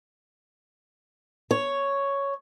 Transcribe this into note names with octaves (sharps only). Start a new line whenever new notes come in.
C#5